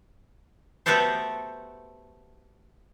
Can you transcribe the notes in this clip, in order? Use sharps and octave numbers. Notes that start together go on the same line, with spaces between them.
A3 B3 F#4 G4 A4 C5